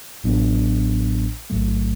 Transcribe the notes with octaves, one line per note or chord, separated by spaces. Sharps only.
A1 A2 F#3 B3 D4
A1 G#2 F#3 A3